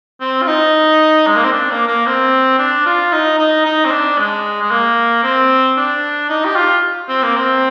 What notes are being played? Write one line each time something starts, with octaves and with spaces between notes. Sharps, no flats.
C4
F4
D#4
G#3
A#3
C4
D4
A#3
A#3
C4
D4
F4
D#4
D#4
D#4
C4
D4
G#3
G#3
A#3
C4
D4
D#4
G4
F4
C4
A#3
C4